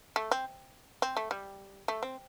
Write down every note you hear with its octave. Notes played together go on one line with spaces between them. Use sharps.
A3
C4
C4
A3
G3
A3
C4